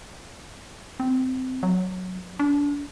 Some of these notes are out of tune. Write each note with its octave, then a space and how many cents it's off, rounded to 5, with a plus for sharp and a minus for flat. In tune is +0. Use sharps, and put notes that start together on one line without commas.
C4 -20
F#3 -5
D4 -30